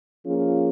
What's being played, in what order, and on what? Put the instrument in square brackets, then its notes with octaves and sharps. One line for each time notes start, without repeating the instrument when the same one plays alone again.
[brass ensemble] F3 A#3 C#4 F4 G#4